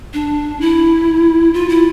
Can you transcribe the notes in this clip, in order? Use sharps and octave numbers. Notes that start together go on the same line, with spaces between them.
D4
E4
F4
E4